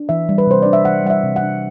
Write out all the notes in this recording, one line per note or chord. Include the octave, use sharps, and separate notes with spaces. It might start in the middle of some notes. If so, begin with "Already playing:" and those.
Already playing: D4
E3 E5
G3
B4
C3 C5
D4 D5
E5
E3 F#5
G3 F#5
E5
C3
F#5
D4